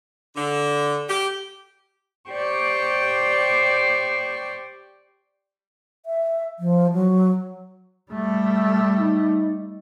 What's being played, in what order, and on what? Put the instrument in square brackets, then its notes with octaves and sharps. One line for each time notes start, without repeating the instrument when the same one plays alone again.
[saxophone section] D3
G4
[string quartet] G4 C5 D5 G5 C#6
[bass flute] E5
F3
F#3
[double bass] G3 A3
[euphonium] D#4